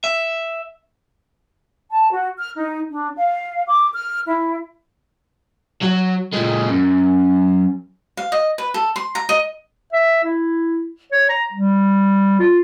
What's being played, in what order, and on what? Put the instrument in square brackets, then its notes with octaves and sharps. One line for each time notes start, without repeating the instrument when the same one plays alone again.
[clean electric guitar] E5
[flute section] A5
F#4
F6
D#4
D4
F5
D6
F6
E4
[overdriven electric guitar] F#3
A#2 G#3
F#2
[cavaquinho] F5
D#5
B4
A4
C6
A#5
D#5
[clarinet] E5
E4
C#5
A#5
G3
F4